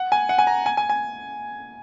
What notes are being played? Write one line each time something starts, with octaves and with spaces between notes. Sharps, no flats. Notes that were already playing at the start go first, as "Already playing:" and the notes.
Already playing: F#5
G#5
F#5
G#5
A#5
G#5
G#5
G#5